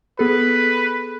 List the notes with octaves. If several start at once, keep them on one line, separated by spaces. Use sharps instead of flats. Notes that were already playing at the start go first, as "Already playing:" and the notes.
B3 G#4 A4 B4